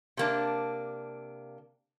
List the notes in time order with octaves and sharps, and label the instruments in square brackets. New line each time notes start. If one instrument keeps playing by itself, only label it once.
[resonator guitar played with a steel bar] C3 A#3 D4